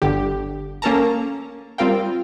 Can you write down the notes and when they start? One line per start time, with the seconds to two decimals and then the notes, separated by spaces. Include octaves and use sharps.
0.02 G1 D3 G4
0.82 A#3 C#4 A4 A#4 A5 A#5
1.78 G3 C4 F4 A#4 F5 G5